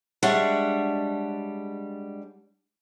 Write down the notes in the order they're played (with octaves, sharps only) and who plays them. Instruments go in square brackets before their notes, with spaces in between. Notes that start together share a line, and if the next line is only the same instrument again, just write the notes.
[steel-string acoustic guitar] G3 G#3 D4 C#5 E5 F#5